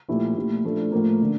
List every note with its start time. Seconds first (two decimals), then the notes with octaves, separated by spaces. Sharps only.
0.08 A#2 F3 A3 E4 G4
0.35 A#2 A3 E4 G4
0.64 F3 A3 D4 A4
0.92 A2 F3 A#3
1.22 D3 F3